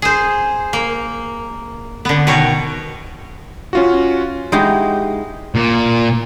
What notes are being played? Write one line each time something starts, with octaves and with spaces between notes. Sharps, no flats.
G#4 C5
A#3
D3 B3
B2 D#3 C#5
C#4 F4 F#4
G#3 D#4 E4 F#4 G4
A#2